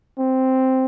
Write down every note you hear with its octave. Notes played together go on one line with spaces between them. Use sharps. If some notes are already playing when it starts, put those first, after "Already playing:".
C4